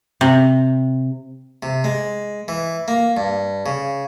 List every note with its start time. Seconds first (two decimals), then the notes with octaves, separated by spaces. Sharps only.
0.21 C3
1.63 C3
1.84 G#3
2.48 E3
2.88 A#3
3.17 G2
3.66 C#3